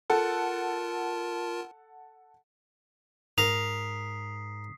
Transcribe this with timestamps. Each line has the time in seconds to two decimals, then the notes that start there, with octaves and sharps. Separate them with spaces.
0.10 F4 A4 A#4 F#5 A5
3.38 G#2 A#4 D#6 B6 C7 F7